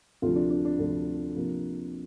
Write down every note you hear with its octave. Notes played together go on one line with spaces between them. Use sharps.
D2 C3 F3 F4
D4
D4
D4
D2 C3 F3
C3 F3 A#3